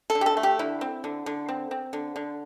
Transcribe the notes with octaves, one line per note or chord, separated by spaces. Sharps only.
A4
D3
G4
A4
A3
G4
D3 E4
C4
D3
D3
C4
C4
D3
D3